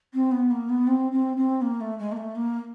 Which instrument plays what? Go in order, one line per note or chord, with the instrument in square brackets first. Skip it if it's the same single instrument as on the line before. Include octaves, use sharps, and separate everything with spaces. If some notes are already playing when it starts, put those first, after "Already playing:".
[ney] C4
B3
A#3
B3
C4
C4
C4
A#3
A3
G#3
A#3
A3
A#3